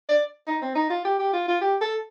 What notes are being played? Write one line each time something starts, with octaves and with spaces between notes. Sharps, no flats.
D5
D#4
C4
D#4
F4
G4
G4
F4
F4
G4
A4